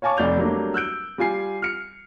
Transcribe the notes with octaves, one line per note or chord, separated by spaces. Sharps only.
C#5 F5 G#5 A5 C#6 D6
F1 D5 G6 F7
F#3 G3 A3 A#3 D4
E6 F#6 G6 D7
G3 F4 G#5 C7
F6 C#7